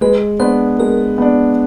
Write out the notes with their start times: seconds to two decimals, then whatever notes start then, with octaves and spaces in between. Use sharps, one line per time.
0.01 G#3 B4
0.40 B3 D4 C5
0.80 G#3 A#4
1.18 B3 D4